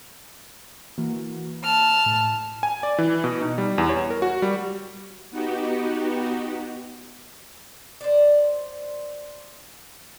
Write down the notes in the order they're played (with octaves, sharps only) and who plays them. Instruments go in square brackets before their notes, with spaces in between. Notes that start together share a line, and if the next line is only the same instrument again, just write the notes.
[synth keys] E3 A#3 F#4
[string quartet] A5 F6
[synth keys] A2
[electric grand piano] G#5
D5
E3
B2
D#4
G3
E2
C#5
A#4
F#4
G3
[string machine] B3 D#4 F#4 G4
[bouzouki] C5 D5